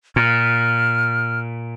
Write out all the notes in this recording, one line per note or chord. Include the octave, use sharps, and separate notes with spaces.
A#2 F6